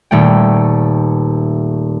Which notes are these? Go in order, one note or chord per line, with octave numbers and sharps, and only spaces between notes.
D#1 A3 G5